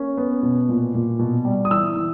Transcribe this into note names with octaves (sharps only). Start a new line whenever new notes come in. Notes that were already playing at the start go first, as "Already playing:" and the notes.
Already playing: A#3 C#4
B3
B2
A#2
A#2
B2
G3
D#6
E3 E6
E3